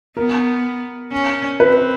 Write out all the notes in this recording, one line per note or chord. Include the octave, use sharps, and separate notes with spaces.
B3 A#4
C#4
C4 B4